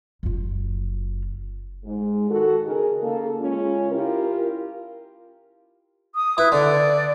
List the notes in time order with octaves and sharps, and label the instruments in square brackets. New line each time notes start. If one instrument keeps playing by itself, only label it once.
[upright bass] F#1 F4
[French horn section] G#2 G#3
D#3 F#4 A4
C#3 D#4 G#4 A#4
C#3 A#3 A4
C#3 G#3 C#4 F4
E4 F4 G4 A#4
[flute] D#6
[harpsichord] E4 [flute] B4
[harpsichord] D3 [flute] D5